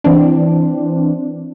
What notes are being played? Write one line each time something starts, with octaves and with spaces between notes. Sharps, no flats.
E3 C4 D4